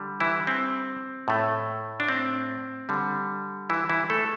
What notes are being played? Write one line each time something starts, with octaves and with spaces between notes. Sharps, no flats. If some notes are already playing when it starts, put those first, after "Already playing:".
Already playing: D3 G3
E3 E4
C4
A2 A3
D4
C4
D3 G3
E3 E4
E3 E4
A3 A4